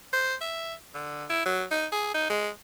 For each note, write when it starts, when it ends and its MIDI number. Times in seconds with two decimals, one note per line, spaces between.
0.13 0.35 72
0.41 0.74 76
0.95 1.25 50
1.30 1.42 64
1.46 1.64 54
1.71 1.87 63
1.92 2.10 68
2.14 2.30 63
2.30 2.49 56